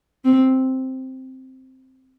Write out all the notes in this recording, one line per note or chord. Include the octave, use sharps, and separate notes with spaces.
C4